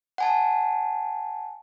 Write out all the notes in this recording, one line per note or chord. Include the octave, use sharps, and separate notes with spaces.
F#5 G#5 A5